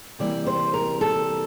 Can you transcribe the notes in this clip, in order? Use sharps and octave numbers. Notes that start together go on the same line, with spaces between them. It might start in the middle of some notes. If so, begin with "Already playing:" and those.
C3 E3 G3 A#3 D5
C5
A#4
A4